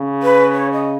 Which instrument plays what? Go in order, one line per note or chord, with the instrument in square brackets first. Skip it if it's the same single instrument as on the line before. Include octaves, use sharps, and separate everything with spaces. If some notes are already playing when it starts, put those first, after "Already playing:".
Already playing: [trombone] C#3
[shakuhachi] B4
C#5
D#5